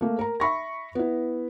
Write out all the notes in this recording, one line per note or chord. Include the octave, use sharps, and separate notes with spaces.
A3 A#3
A#4 A#5
E5 B5 C#6 A#6
B3 E4